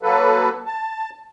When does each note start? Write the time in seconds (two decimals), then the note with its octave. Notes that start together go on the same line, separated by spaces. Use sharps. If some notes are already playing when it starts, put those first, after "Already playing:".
0.03 F#3 A#3 A4 B4
0.66 A5